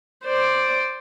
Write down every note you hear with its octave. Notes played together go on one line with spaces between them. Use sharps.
C5 D5